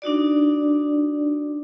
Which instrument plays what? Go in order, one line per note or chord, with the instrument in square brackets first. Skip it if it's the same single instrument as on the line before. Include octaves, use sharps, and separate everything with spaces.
[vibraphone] D4 D#4 F#4 D5